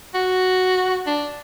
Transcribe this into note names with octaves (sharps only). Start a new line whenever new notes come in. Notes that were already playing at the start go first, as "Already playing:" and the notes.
F#4
D4